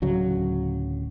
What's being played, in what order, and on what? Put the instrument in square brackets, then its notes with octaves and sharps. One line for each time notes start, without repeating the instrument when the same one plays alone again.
[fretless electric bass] D1 C#3 F#3